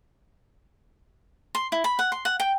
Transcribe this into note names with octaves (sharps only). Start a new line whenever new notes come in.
C6
E4
B5
F#5
C6
F#5
G5